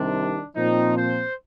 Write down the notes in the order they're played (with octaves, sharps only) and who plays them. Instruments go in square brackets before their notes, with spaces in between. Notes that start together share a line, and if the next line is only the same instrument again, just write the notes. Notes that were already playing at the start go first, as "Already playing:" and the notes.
Already playing: [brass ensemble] C2 C3 D#3 D4
A#2 F3 C4 D#4
C5